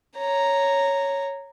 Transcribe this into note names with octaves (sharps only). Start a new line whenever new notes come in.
C#5 A#5